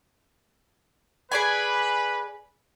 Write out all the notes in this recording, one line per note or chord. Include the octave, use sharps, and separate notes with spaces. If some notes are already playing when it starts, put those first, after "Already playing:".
G#4 B4 D5 G#5 B5